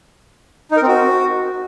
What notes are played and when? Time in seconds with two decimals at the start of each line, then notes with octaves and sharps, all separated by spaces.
0.71 D#4
0.77 A#4
0.82 C4
0.88 F#4